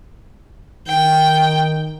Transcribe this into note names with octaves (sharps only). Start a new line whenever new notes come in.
D#3 G5